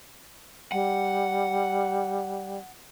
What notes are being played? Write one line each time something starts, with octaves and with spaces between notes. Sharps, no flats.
G3 F#5